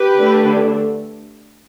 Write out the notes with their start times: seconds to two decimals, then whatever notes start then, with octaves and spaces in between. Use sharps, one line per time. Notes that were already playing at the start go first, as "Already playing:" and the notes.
Already playing: G4 B4
0.18 D3 A3 D4